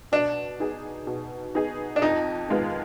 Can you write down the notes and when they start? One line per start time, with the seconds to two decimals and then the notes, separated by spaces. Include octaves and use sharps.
0.12 B2 D4
0.60 B3 D#4 G#4
1.07 B2
1.55 B3 D#4 G#4
1.96 D4
2.02 F2 D#4
2.49 D#3 G#3 B3 F4